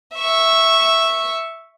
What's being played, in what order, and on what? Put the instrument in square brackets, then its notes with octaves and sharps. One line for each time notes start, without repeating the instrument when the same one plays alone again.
[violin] E5 C#6